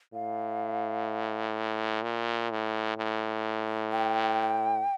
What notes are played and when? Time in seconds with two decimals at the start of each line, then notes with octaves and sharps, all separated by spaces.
0.14 A2 F5
2.03 A#2
2.51 A2
2.98 A2
3.92 G5